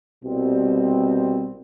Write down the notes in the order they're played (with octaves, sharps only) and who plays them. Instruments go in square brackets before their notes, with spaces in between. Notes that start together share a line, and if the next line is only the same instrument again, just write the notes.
[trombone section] C2 B2 G3 C4